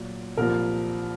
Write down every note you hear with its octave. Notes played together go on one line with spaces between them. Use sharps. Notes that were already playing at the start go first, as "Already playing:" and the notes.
Already playing: A#2 F#3
C2 A#2 F3 A#4